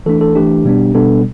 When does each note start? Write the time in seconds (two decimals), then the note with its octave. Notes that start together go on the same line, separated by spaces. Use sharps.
0.06 E3 A3 D4 A4
0.21 A4
0.35 E3 A3 D4 G4
0.64 B2 G3 B3 D4
0.94 B2 G3 B3 D4 A4